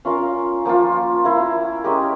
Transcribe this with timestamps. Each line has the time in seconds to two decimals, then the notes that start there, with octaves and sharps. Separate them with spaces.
0.05 C#4 F4 A#4 F5
0.65 F3 A#3 F4
1.25 E4 A#4 F5
1.84 G#3 C#4 G4 A#4